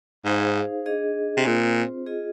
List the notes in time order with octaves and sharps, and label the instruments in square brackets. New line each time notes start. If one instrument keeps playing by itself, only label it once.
[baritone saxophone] G#2 [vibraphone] D#4 G#4 C5 F5
[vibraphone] D4 G#4 D#5
[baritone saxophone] C3
[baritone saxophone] A#2 [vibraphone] C4 F4 C5
[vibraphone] F4 G#4 D#5